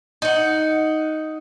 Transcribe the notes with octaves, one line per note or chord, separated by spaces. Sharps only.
D#4 F#5